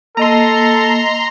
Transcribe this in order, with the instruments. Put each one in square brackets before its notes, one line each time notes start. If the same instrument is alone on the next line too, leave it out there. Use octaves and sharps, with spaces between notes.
[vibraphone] A#3 D#5 [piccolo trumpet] A4 [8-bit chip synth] A#5 C6